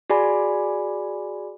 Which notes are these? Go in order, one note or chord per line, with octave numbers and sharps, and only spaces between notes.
F#4 G#4 D5 G#5 B5